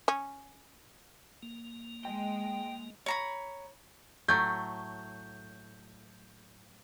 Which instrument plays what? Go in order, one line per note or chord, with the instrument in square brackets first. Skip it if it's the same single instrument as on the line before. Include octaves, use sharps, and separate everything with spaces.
[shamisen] C#4
[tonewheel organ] A#3
[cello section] G#3 [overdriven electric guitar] G5
[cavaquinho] C#5 A#5 B5
[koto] A2 F#3 A3 [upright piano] G6